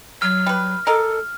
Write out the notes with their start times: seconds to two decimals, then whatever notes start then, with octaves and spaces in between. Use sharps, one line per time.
0.22 F#3 F6
0.46 G3 B4
0.87 A4 A#4 D#5 A5